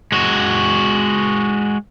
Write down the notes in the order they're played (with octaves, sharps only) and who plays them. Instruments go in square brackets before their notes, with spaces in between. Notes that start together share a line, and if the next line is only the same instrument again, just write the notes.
[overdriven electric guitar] G#3 F#4